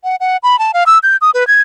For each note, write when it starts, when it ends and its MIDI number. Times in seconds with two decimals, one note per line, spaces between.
0.04 0.16 78
0.20 0.37 78
0.43 0.59 83
0.59 0.72 81
0.74 0.84 77
0.86 0.98 88
1.03 1.17 91
1.21 1.31 87
1.34 1.46 71
1.48 1.61 92